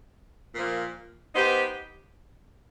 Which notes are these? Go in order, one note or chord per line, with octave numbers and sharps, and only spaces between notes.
A#2 F3 A#3
B3 D#4 G4 C5